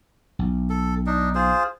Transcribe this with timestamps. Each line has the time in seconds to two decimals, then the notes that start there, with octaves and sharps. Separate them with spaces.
0.39 B1
0.70 A4
1.07 D4 D#4
1.35 F4 G#4 C5